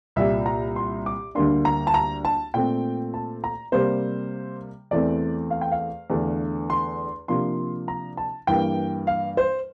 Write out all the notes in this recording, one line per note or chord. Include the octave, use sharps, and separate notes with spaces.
C2 A#2 G3 E5
A#5
C6
D6
D2 D3 G3 A#3 D4 C6
A#5
A5
A#5
A5
A#2 A3 C4 G5
A5
A#5
C3 G3 A#3 C5
E2 E3 A3 C4 D5
F5
G5
F5
E2 D3 A3 D4
C6
C3 F3 A#3 D4 C6
A#5
A5
G2 E3 A#3 G5
F5
C5